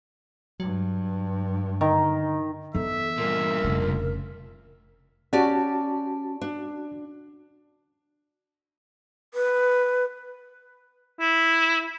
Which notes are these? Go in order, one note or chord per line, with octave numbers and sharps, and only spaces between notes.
G2 F#3
D3 D#3
E3 B3 A4 E5
G2 A#2 A#4
F1 C#3
C#4 F#4 G4 D5 A5
D4
B4
E4